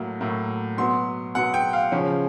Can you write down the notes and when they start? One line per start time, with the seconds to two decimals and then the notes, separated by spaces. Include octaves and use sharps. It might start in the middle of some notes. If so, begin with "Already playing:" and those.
Already playing: A2 F#3 A#3
0.20 A2 F#3 A#3
0.77 B2 F#3 B3 C6
1.35 B2 F#3 B3 F#5
1.54 G5
1.73 F5
1.92 C#3 F3 G#3 C#4